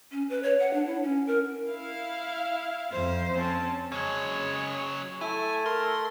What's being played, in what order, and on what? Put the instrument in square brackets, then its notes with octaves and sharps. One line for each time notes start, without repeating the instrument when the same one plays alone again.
[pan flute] C#4
B4
C#5
F#5
D4
E4
C#4
A#4
[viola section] E4 F5
[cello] F2 C5
[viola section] C4 C#4 A5
[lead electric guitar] C#3 F#3 [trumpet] G#3 [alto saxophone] C#5
[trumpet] A3 [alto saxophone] E4 [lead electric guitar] G#5
[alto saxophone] A#4 [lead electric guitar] C6